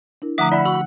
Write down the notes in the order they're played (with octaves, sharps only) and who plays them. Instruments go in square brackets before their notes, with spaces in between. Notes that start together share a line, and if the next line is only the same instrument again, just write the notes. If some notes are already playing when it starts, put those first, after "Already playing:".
[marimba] D4 E4 A#4
[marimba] D3 F3 A3 [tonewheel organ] E5 D6 [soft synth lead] F#5 [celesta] A#5 D#6
[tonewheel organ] E4 E5 [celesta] D5 B5 [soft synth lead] F#5
[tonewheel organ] F#4 B5 [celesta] E6